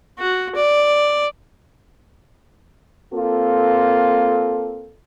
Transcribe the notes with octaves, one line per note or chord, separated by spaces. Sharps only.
F#4
D5
A#3 C4 F4 A4